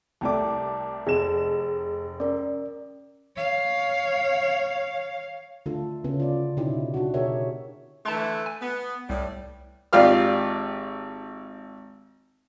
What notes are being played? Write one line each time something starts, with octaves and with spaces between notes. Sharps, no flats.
C2 A3 D5 G5 A5 D6
F1 G#4 D#5 E7
C#4 A#4 D5
C#5 F5
D3 A3 F4 A4
C#3 B3 C#4
F4 D5
B2 D3 C#4 D#4 E4 G4
D4 F#4
B2 G4 G#4 A#4 C#5 E5
D3 E3 A3 A5 C6
G#5
B3
C2 A2 G3
G#1 F4 G4 D5 F5 F6